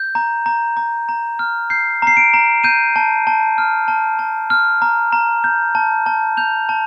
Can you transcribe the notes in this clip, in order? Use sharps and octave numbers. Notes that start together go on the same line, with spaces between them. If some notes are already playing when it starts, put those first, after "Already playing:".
Already playing: G6
A#5
A#5
A#5
A#5
F6
G6 C7
A#5 C7
D7
A#5
G6 D#7
A5
A5
F6
A5
A5
F6
A#5
A#5
G6
A5
A5
G6 F7
A5